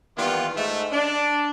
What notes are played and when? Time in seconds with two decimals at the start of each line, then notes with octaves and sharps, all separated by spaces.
0.17 D#3 E3 G3 A#3 B3 F4
0.57 G#2 A3
0.91 D4